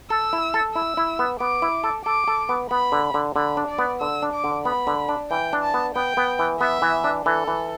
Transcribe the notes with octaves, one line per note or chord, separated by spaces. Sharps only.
A4 E6
E4
A4
E4 E6
E4
B3
B3 D6
E4
A4
A4 D6
A4
B3
B3 B5
D3
D3
D3 B5
D4
D5
B3
D3 E6
D4
D6
D3
B3 B5
D3
D4
E3 G5
D4
A5
B3
B3 G5
B3
E3
B3 E5
E3
D4
E3 A4
E3